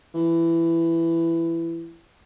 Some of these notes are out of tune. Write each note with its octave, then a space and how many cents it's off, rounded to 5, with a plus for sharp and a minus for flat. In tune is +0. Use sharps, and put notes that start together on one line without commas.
E3 +15